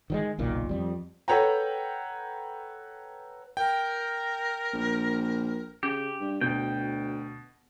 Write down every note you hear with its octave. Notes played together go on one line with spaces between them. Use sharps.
D#3 F#3 G#3
F#1 B1 A#2 D#3
F2 G3
A4 B4 C#5 F#5 G5 A#5
A#4 G5
A#1
C#3 G4
G2
D2 B2 G5